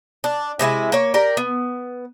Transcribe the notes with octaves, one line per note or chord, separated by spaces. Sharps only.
D4
C3 G#3 E4 G#5
A#3 C#5
G4 A#4 D5
B3